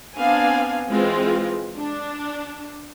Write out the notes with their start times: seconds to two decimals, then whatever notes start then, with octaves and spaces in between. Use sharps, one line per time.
0.16 B3 C4 D4 F5 G#5
0.89 E3 G#3 C4 F4
1.77 D4